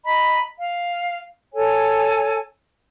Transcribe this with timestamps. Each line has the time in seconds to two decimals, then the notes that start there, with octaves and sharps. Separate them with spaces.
0.05 D#5 A#5 B5
0.58 F5
1.54 A4 C#5 G#5